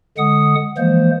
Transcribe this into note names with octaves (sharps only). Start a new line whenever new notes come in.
D3 G#3 F#5 D#6
E3 F3 G#3 A#3 C5